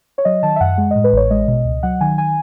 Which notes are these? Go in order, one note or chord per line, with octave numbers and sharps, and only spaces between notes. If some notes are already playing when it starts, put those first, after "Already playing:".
C#5
F#3 D#5
D#3 A5
E5
F#2 F#5
G#3
A2 D#5
B4
A1 C#5
G#3 D#5
B2
C#2
F#3 F#5
D#3 G#5
G#5